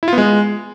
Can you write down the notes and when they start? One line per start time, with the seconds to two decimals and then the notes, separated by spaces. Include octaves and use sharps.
0.03 E4
0.08 F4
0.13 B3
0.18 G#3